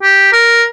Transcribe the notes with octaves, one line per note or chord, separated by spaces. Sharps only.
G4
A#4